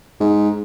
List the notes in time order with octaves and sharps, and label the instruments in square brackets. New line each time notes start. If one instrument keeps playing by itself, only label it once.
[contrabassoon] G#2